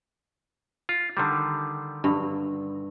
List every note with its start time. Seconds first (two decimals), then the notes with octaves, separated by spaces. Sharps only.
0.89 F4
1.17 D3 D#3 G3
2.04 G2